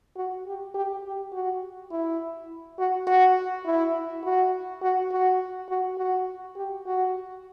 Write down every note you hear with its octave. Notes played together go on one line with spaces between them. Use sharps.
F#4
G4
G4
G4
F#4
E4
F#4
F#4
E4
F#4
F#4
F#4
F#4
F#4
G4
F#4